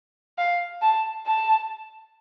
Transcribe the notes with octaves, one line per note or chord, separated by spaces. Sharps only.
F5
A5
A5